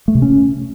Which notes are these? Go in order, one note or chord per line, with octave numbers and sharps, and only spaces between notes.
A3
C3
C#4